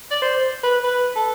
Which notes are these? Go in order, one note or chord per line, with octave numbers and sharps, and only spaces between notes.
D5
C5
B4
B4
A4